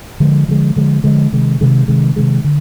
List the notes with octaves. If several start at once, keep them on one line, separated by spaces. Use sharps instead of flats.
D3 F3 G#3
D3 F3 G#3
D3 F3 G#3
D3 F3 G#3
C3 D#3 G#3
C3 D#3 G#3
C3 D#3 G#3
C3 D#3 G#3
D3